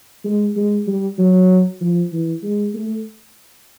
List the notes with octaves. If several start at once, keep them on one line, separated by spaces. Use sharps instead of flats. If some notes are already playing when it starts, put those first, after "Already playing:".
G#3
G#3
G3
F#3
F3
E3
G#3
A3